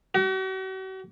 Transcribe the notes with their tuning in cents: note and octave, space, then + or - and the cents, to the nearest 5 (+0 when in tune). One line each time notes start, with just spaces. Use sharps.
F#4 +45